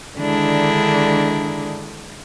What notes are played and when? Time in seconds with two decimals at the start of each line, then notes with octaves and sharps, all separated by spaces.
0.18 D3 D#3 G#3 D4 E4